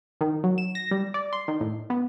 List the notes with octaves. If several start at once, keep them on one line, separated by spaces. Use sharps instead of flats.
D#3
F#3
E7
A#6
G3
D5
C6
D#3
A2
B3